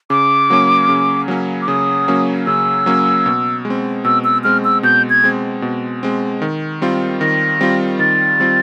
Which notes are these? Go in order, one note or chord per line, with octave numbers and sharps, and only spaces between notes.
C#3 D6
F#3 A#3 C#4
C#3
F#3 A#3 C#4
D6
C#3 D#6
F#3 A#3 C#4
C#3 E6
F#3 A#3 C#4
B2
G#3
C4
B2 E6
E6
G#3 C4 F6
E6
B2 G6
G#6
G#3 C4
B2
G#3 C4
D#3
G3 C4 F4
D#3 A#6
G3 C4 F4
D#3 A6
G3 C4 F4